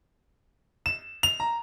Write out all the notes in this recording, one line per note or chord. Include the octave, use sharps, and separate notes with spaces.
E7
F7
A#5